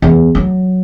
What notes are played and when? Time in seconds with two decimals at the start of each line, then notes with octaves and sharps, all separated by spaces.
0.02 E2
0.35 F#3